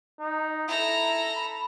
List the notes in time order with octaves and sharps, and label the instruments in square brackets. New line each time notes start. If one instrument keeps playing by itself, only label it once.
[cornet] D#4
[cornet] E4 [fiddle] A4 A#5
[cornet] B5